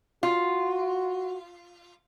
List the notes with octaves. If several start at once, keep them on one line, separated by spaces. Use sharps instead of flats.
F4 F#4